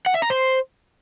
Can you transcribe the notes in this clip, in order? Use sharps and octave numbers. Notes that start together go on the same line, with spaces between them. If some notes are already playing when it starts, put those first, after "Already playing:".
F#5
E5
A#5
C5